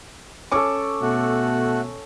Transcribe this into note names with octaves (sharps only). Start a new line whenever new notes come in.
C#4 A4 C#6 D6
B2 A3 F#4